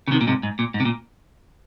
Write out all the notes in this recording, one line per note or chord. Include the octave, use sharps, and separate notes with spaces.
C#3
C3 D#3
A#2
G#2 C3
G#2
A#2
G#2
C3
A#2